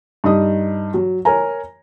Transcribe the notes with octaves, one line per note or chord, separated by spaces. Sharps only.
G2 D#4 D#6
F#3
A#4 C#5 G#5 A#5